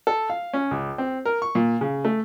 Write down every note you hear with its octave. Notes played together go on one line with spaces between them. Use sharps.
A4
F5
C#4
C#2
C4
A#4
C#6
A#2
C#3
A3